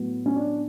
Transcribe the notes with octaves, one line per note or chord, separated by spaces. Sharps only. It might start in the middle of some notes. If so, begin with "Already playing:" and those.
Already playing: A2 F#3 B3
C#4
D4